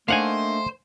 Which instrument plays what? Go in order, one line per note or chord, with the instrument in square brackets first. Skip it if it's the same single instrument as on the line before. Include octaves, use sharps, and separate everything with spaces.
[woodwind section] A3 [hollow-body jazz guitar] A#3 D4 D#4 [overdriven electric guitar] C5 [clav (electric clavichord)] F5 F#5 G#5